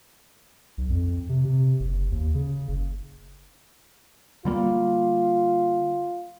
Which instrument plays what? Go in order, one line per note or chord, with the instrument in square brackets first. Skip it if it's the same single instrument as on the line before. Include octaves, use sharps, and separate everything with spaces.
[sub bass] B1
F2
C3
C3
F#1
D#2
C#3
F#1
[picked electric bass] D3 G3 A#3 [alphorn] F4